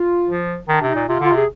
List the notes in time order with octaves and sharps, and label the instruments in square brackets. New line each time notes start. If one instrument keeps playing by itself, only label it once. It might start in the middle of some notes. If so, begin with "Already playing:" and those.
Already playing: [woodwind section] F4
[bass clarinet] F3
[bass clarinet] D#3 [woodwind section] D4
[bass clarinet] C3
[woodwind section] D#4
[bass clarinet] A#2
[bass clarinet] C3 [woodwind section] F4
[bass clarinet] D3 [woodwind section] F4
[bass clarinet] C3 [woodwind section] G#4